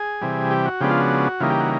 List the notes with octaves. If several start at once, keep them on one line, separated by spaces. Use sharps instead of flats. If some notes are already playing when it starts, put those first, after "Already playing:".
Already playing: G#4
C3 E3 G3
G4
F#4
C#3 F3 G#3 B3 D4 G4
F4
F#4
C#3 E3 G3 A#3 D#4 F4
G4
F#4